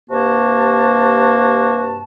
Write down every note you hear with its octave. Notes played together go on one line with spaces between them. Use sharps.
G2 C3 A#3 F#4 A5